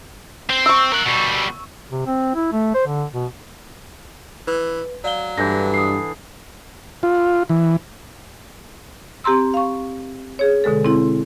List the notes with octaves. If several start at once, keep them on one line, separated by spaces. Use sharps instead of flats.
C4
C#6 E6
A#4 F#5
B2 G3
C3
C4
E4
A3
C5
D3
B2
E3 B4
F#3 D5 F5 G7
G2 D3 E3 G6 A#6
D#6 C7
F4
E3
C4 G4 A#5 C6 E6
F5 C#6
G#4 C#5
B2 D3 G#3 A4
C4 E4 C6